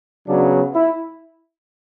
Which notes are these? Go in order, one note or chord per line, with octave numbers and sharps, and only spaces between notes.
C#3 F#3 B3 D4
E4